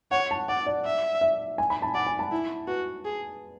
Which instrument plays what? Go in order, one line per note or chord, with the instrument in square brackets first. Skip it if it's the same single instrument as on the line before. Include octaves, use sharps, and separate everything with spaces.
[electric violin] C#5 [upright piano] F#5
[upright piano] A5
[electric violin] D5 [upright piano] F#5
[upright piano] D5
[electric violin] E5
[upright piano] E5
G#5
B5
A5
[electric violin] D5 [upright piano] F#5
[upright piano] G#5
A5
[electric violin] E4
[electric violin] F#4 [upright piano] B4
[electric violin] G#4